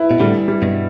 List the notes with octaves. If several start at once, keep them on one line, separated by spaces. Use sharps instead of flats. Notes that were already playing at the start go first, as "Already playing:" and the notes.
Already playing: E4 B4
B2
A2 D3 G3
G3
G2 B2